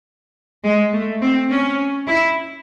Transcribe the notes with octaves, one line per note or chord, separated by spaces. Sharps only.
G#3
A3
C4
C#4
E4